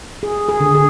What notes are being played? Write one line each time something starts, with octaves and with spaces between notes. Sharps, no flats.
G#4
G#4
D3
G#4